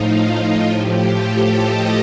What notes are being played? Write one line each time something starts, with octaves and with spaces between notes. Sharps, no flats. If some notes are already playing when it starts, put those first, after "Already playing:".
Already playing: A2 F3 D#4 F4
A2 F3 G4
A4
D#5